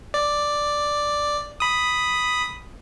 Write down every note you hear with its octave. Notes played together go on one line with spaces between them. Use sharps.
D5
B5 D#6